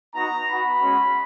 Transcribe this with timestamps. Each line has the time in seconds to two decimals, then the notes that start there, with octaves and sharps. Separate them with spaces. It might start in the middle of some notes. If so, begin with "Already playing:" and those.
0.14 B3 D#4 F#4 A#5
0.48 B3 F#4 B5
0.81 G#3 C#4 F#4